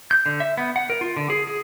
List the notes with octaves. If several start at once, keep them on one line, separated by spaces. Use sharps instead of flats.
G6
D3
E5
B3
F#5
A#4
F4
D3
G#4
G#4